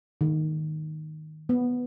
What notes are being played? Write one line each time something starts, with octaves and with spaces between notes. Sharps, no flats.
D#3
B3